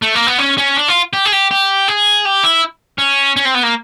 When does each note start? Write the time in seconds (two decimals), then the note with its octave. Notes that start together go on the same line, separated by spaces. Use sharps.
0.02 A3
0.15 A#3
0.27 B3
0.39 C#4
0.58 C#4
0.77 D4
0.88 F4
1.13 G4
1.25 G#4
1.32 G4
1.51 G4
1.88 G#4
2.25 G4
2.44 E4
2.98 C#4
3.36 C#4
3.45 C4
3.54 B3
3.63 A#3